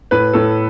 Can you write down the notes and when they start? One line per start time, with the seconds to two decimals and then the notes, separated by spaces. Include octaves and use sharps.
0.11 A2 B4
0.34 A2 A4